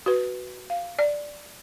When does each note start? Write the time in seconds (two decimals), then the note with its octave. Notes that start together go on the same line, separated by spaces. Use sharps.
0.06 F#4 B4
0.70 F5
0.99 D5